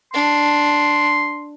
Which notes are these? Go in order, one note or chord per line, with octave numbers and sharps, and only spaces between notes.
D4 C6